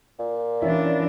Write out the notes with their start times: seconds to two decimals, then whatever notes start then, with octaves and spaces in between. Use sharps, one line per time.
0.19 A#2
0.62 E3 C#4 D4 E4 E5